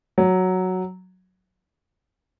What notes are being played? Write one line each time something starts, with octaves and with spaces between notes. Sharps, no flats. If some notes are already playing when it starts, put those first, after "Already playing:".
F#3